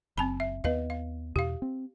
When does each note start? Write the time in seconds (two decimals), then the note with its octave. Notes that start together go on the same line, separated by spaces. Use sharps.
0.18 F#1 C4 A5 B5
0.40 E5
0.64 D#2 B3 B4 D#5 F5
0.90 F5
1.36 E2 B2 G4 F5
1.62 C4